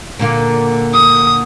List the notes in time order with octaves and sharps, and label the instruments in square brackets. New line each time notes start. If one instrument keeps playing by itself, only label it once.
[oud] A#2 D3 A#3
[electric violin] D#6